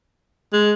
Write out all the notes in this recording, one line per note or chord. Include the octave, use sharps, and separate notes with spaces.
G#3